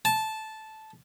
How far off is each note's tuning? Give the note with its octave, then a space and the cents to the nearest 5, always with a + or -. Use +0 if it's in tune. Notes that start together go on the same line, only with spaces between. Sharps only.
A5 -10